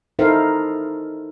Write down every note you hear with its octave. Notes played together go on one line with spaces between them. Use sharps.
D#4 E4 A4 A#4 C5 F5